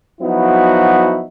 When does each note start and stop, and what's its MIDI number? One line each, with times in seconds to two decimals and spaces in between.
0.21 1.23 53
0.21 1.23 54
0.21 1.23 59
0.21 1.23 63
0.21 1.23 64
0.21 1.23 66